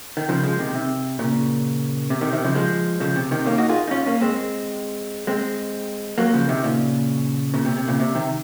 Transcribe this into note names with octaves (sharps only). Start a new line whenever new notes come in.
D#3
C#3 F3
F3 G#3
C3 D#3
C3
A#2 C#3
C3
C3 D#3
C3 D#3
C#3 F3
F3 G#3
C#3 F3
C3
C3 D#3
A#3 C#4
D#4 F#4
F4 G#4
D#4
C#4 F4
A#3 C#4
G#3 C4
G#3 C4
F#3 A#3
C#3 F3
C3 D#3
A#2 C#3
A#2 C#3
C3
C3
A#2 C#3
C3
C3 D#3